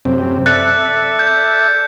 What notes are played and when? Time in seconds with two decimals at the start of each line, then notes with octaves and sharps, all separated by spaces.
0.05 F#2 C3 C4
0.46 A4 D5 E5 F#6 A6 C#7
1.19 G6